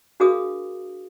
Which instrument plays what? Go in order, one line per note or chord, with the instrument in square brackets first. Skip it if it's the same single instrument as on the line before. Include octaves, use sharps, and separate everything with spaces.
[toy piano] D4 F#4 G#4 A#4 F5 D#6